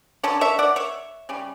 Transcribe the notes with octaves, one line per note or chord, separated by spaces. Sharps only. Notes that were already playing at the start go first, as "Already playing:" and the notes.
D3 F#3 C#4 A4 C#5
C#5 E5
D5 F#5
C#5 E5
C#3 G3 C#4